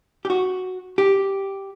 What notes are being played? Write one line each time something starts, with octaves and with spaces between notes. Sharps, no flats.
G4
F#4
G4